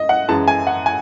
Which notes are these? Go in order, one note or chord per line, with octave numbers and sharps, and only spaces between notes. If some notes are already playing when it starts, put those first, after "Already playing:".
Already playing: D#5
F#5
F#2 E3 G#3 A5
G#5
F#5
G#5